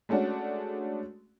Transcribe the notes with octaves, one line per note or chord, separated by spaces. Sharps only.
G#3 A3 C#4 D4 F#4